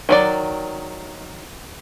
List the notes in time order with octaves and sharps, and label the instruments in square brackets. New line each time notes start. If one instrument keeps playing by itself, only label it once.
[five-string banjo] D#3 F#3 D5